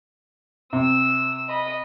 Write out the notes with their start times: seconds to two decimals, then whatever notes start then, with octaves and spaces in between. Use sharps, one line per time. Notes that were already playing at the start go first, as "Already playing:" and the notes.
0.73 C3 E6
1.48 D#5 B5